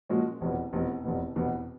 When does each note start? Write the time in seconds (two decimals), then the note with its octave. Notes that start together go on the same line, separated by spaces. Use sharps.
0.09 A#2 F3 G#3 C#4 F#4
0.41 F1 E2 B2
0.73 F1 E2 B2
1.04 F1 E2 B2
1.36 F1 E2 B2